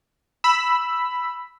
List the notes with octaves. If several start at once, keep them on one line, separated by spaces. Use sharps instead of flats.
B5 E6